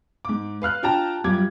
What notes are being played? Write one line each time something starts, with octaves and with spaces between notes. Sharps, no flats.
G#2 D6
B4 F5 F6 F#6
D4 F4 G4 G5 A5 A#5
F#2 G3 F4 D6 G#6